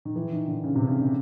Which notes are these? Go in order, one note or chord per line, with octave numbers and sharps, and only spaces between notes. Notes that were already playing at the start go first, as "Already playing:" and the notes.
D#3
E3
D#3
D3
C#3
C3
C#3
D3